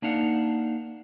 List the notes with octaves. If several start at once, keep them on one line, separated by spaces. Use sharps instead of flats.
A#3 D4 D#4 F5 F#5